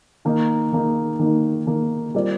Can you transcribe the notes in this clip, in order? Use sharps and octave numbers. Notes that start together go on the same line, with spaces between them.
D#3 A#3 D#4
D#3 A#3 D#4
D#3 A#3 D#4
D#3 A#3 D#4
G3 C4 F4 A#4 D5